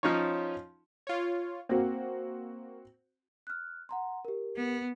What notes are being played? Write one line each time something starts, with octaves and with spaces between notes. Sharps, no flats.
F3 C#4 D#4 F4 C#5
F4 C#5
A#3 C4 F#4
F6 F#6
F#5 A#5 C6
G4 A#4
B3